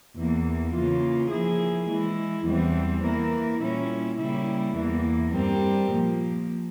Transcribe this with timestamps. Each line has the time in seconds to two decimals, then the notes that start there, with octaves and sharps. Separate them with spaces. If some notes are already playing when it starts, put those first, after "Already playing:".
0.15 E2 E3 A#3
0.72 C#3 E3 A#3 F4
1.29 F3 A#3 E4 G#4
1.87 E3 G#3 E4
2.44 E2 E3 G3 C4
3.02 E3 A#3 E4 A#4
3.58 A#2 G3 C#4 E4
4.16 C#3 G3 A#3 E4
4.73 E2 E3 A#3
5.31 G2 G3 C4 G4 A#4
5.88 A#2 F3 A#3